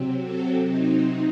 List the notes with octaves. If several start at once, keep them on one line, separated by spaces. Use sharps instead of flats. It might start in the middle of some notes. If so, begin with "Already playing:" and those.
Already playing: C3 F#3 C4
F#4 A4
D#4